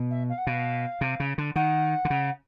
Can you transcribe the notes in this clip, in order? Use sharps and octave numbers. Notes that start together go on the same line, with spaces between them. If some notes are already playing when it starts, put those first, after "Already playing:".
Already playing: B2
E5
F5
F#5
B2 F5
C3
C#3
D3
D#3 F#5
D3
C#3